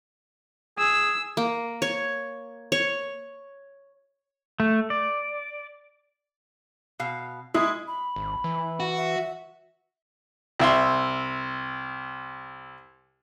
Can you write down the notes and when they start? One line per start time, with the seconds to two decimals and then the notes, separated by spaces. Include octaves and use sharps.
0.78 G#4 E6
1.37 A#3
1.82 C#5
2.72 C#5
4.60 A3
4.90 D5
6.99 B2 F5
7.54 G#3 E4
7.88 B5
8.16 G#1
8.44 E3
8.80 F#4
8.97 E5
10.59 C2 E5 C6